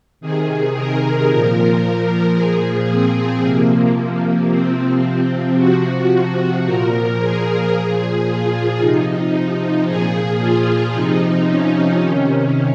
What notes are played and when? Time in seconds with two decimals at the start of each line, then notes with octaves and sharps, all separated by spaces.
0.21 C3 D#3 G#4
0.75 A#4
1.28 A#2 F3
2.35 A#2 F3 G#4
2.89 C4
3.43 C3 F3 A#3
3.96 A#3
4.50 C3 F3 C4
5.57 C3 F3 F#4
6.65 A#2 F3 A#4
7.19 G#4
7.72 A#2 F3 G#4
8.25 F4
8.79 C3 F3 D#4
9.86 A#2 F3 G#4
10.40 F4
10.94 C3 F3 D#4
11.47 C#4
12.01 C3 D#3